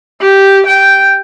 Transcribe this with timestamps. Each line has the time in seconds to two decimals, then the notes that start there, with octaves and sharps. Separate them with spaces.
0.21 G4
0.66 G5